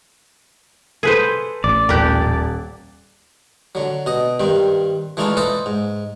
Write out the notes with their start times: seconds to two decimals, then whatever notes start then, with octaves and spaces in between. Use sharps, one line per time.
1.03 G#4 A4 B4 C5
1.64 A1 D5
1.89 D#1 G4 A#4 F#6
3.75 D3 F#3
4.06 B2 D#5
4.40 G2 D#3 C4
5.17 E3 G#3 A3 D4 D#4 F4
5.37 A4 B4 C5 D#5 E5
5.66 G#2